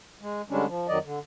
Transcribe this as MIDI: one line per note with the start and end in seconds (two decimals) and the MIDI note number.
0.22 0.42 56
0.50 0.65 50
0.50 0.65 55
0.50 0.65 56
0.50 0.65 61
0.50 0.65 62
0.67 0.87 53
0.88 0.98 41
0.88 0.98 51
0.88 0.98 54
0.88 0.98 74
0.88 0.98 75
1.04 1.19 50